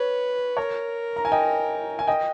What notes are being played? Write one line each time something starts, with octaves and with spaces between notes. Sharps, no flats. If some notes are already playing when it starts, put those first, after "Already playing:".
Already playing: B4 C#5
A#4 C#5
A#5
G#5
D#5 G5
G#5
D#5 G5